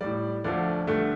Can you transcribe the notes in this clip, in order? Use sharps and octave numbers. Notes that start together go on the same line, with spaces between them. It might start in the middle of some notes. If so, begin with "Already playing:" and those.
A2 G3 D5
D2 D3 F3 A3 D5
G2 D3 A3